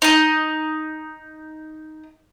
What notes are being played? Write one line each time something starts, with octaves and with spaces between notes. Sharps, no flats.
D#4 D#5